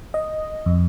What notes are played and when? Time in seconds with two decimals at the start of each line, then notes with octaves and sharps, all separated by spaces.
0.14 D#5
0.66 F2